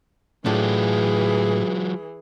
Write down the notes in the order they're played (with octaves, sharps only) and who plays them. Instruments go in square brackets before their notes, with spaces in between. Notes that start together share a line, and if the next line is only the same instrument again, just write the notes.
[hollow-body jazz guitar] A2 D4 A4 [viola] E3 G#4 [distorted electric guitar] F#3 F4